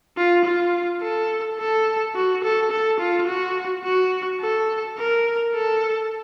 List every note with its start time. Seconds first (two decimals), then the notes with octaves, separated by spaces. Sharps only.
0.17 F4
0.45 F4
1.02 A4
1.59 A4
2.15 F#4
2.44 A4
2.71 A4
3.00 F4
3.28 F#4
3.84 F#4
4.41 A4
4.98 A#4
5.54 A4